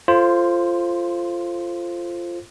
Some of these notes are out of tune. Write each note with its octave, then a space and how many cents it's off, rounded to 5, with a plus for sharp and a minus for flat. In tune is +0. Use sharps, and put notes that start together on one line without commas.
F4 -15 A4 +0 C5 +10